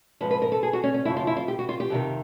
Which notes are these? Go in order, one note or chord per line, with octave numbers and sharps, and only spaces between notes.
G#2 F3 B4
B4
A#4
A4
G#4
F#4
C#4
C#4
F#2 C#3 F3 E4
F4
E4
F4
G4
F#4
F4
G4
F2 C3 D#3